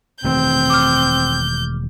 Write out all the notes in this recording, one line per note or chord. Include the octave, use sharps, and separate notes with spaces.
E1 D#3 A3 C4 G6
D6 F6